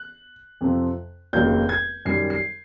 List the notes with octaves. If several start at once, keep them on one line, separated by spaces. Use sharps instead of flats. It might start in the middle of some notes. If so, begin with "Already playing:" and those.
Already playing: F#6
F2 C3 F3
F1 D#2 C#3 F#3 G6
G#6
F#2 D#3 G3 C7
C7